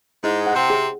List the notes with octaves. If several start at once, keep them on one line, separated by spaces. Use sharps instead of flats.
G#2 G#3 E4
F#5
C3 C4
G#4